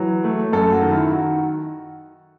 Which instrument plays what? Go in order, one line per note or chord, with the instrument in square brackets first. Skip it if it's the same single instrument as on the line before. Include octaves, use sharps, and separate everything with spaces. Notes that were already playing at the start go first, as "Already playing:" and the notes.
Already playing: [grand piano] E3 F#3
A3
F#2 A4
F#4
D#3
E4
D#3 F#4